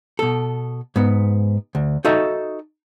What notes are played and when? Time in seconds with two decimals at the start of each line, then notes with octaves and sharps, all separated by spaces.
0.19 B2 A4
0.96 G#2 B3
1.75 D2
2.05 D#4 F#4 A4 D#5 E5